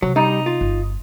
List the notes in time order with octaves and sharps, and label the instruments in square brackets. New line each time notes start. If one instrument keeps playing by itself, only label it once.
[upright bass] C3 [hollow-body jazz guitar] F#3
[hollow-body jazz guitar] G3 [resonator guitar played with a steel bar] D#4
[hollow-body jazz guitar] F4
[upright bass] G1